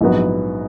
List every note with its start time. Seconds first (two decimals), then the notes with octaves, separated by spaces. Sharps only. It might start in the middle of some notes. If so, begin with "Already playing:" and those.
0.01 A#1 G#2 F#3 B3 F#4